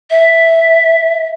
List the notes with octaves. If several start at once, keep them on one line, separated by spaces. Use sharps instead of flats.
E5